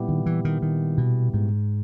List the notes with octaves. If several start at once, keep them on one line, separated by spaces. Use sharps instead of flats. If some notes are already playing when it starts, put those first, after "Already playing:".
Already playing: A#2 G3 B3 E4 G4
D#3
E3
D#3
D#3
B2
G#2